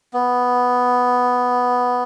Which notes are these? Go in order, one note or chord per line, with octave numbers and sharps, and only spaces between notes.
B3